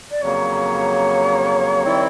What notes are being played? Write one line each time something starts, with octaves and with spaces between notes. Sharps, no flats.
D5
F2 C#3 F#3 A#3 C#5
D#3 G3 C4 E4